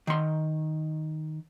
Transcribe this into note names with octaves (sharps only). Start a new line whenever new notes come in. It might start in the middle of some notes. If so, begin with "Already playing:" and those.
D#3 C6